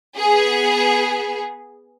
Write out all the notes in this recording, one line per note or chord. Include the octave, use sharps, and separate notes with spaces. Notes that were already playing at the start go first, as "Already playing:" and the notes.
B3 G#4